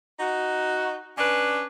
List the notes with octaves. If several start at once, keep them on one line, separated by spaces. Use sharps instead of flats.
D#4 F#4
C#4 D4 B4